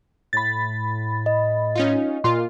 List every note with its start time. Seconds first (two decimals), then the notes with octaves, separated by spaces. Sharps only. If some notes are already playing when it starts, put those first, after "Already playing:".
0.33 A2 B5 A6
1.26 D#5
1.75 C#4 D#4 F4
2.24 A#2 F4 A#4 C6